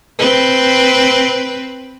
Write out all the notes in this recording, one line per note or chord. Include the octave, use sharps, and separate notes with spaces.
C4 B4